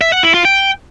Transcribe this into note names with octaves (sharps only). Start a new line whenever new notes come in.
E5
F#5
E4
F4
G5